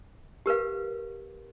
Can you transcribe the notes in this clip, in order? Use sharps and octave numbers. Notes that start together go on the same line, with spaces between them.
G4 A#4 B4 F5